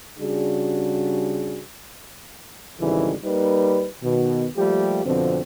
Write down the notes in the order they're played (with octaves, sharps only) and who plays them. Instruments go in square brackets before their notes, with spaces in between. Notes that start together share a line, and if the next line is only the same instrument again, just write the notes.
[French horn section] C#3 G3 D4 F#4 G#4
[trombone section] G#1 C#3 E3 G3 D#4 A4
G3 A#3 D#4 B4
B2 D#3
F3 G3 A3 A#3 G4
F2 B2 D3 F3 C4